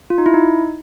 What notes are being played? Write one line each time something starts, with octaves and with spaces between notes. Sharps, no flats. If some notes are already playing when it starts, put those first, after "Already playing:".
F4
D#4
E4
D#4